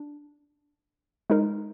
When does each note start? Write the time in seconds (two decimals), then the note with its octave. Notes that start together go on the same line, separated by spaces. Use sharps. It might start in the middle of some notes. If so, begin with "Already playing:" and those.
Already playing: D4
1.30 G#3 D#4 A#4